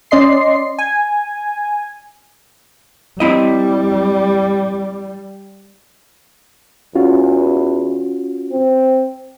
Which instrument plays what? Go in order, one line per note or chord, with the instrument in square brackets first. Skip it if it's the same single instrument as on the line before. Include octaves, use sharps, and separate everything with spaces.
[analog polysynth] C#4 D5 D#5 C6 C7
G#5
[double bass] G3 [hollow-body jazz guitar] C4 E4 D#5
[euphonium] E2 [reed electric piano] C#4 F4 F#4
[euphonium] C4